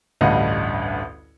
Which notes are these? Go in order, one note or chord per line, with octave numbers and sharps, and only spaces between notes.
A1 D2 G2 D#5 F5 F#5